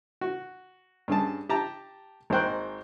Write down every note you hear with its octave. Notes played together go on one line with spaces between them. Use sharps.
F#4
G2 C#4 G#4 A5
G4 A5 A#5
G#1 G#3 A#3 C5 G5 F#6